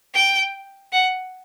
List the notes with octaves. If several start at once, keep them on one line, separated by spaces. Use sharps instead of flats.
G5
F#5